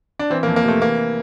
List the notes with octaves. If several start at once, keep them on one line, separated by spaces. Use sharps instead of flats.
D4
E3 C4
A#3
F2
A#3
C3 A3
E3 A#3